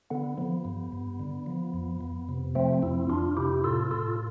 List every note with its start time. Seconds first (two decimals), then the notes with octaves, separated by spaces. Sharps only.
0.10 D3 B3
0.37 F3 B3
0.65 G2
0.92 G2
1.19 D3
1.46 F3
1.74 F2
2.01 F2
2.29 C3
2.55 F3 A3 C4
2.82 F2 C4 E4
3.10 F2 D4 F4
3.37 C3 E4 G4
3.64 A2 F4 A4
3.91 A2 F4 A4